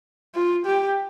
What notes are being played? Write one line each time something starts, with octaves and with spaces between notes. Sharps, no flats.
F4
G4